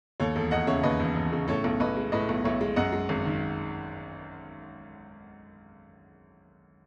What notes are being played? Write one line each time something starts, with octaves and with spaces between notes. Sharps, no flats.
D#2 A4 C#5
E1 A4
E1 D#5 F#5
C#3 C#5 E5
D#2 B4 D#5
E1
E1
C#3
A2 A4 C#5
B1
B1 B4 D#5
G#3
A2 B4 D#5
B1
B1 C#5 E5
G#3
F#2 D#5 F#5
G#3
G#1
D#3